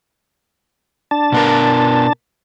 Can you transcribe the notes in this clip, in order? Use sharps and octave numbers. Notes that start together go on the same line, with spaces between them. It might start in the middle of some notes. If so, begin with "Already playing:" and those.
D4 A5
B2 B3 A#4